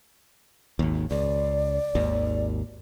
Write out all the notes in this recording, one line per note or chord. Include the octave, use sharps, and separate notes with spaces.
G#1 D#2
C#2 D5
G#1 D#2